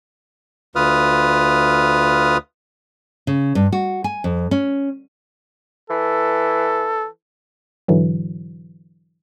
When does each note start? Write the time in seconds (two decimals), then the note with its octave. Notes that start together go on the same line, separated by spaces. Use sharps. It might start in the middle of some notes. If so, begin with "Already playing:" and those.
0.76 D2 F4 B4 D#6 F6
3.27 C#3
3.55 G2
3.73 F#4
4.04 G#5
4.24 F2
4.51 C#4
5.90 E3 A4
7.88 G#2 D3 E3 F#3